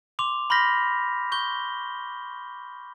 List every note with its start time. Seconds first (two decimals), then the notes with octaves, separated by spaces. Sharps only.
0.19 C6 D6 F7
0.50 B5 C6 F6 G6 A#6 B6
1.32 C#6 G6 G7